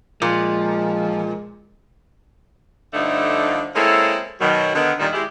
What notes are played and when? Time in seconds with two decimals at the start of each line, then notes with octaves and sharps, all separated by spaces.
0.22 A#2 F3 G#3
2.94 G2 D3 F3 A3 D4 D#4
3.75 G#3 A#3 C4 C#4 E4 A4
4.40 B2 D#3 F#3
4.75 D3 D#3 B3
4.99 A#2 D#3 G3
5.13 G#3 E4 G4